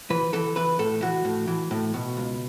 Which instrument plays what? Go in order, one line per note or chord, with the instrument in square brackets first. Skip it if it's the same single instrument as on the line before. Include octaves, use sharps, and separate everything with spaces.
[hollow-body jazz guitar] E3 B4
E3 A4
E3 B4
A2 A4
E3 F#4
A2
E3
A2
B2
C#2